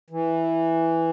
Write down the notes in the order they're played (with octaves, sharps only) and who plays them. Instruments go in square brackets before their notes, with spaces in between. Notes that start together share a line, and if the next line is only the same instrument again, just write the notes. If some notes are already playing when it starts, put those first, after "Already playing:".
[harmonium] E3